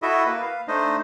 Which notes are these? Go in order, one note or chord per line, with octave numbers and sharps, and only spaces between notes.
E4 F#4 A4 D#5 E5
A#3 B4
F5
A3 D4 D#4 C5 D#5